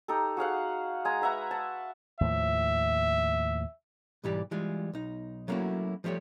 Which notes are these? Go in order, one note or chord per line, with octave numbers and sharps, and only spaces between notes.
D#4 G4 A4
F#4 G#4 F5 F#5
G#3 G#5 A#5
B4 E5 F#5 A#5
A5
D#2 A2 F3 E5
B1 G#2 E3 G3 G4 D5
E3 G3 G#3 F4
B1 D#4
F#3 A3 A#3 C#4 E4 F#4
F3 G3 A3 G4 C#5